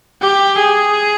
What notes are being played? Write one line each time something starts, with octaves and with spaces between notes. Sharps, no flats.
G4
G#4